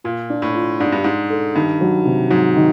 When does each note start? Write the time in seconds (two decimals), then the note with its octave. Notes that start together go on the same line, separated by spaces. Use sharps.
0.04 A#2 F4
0.30 D4
0.42 A2
0.54 F4
0.80 G#2 D4
0.92 G2
1.04 G#2 D4
1.30 A4
1.55 G2 D#3
1.81 F#3
2.05 C3
2.30 G#2 F#3
2.56 D#3